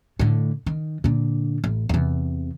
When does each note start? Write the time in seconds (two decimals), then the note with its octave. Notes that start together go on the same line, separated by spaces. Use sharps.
0.19 A2 D3
0.66 D#3
1.04 A#2 D3
1.64 A1
1.89 E2 C3